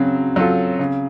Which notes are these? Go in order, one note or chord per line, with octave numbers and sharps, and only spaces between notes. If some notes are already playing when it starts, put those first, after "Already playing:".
Already playing: C#3 F#3 C4
F#3 C4 F4 A4
C#3